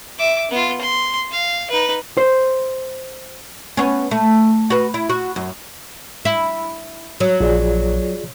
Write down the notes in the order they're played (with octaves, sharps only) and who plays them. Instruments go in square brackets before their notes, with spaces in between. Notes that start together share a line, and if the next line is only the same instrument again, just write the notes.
[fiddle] E5 D6
B3 F4
C6
F5
D#4 B4
[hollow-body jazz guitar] C5
[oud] B3 C#4
A3
F#4 B4
E4
F#4
F#2
E4
F#3
[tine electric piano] A#1 [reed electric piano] F4 G#4 D5